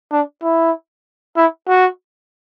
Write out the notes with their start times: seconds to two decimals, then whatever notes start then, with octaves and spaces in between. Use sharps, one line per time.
0.12 D4
0.43 E4
1.37 E4
1.68 F#4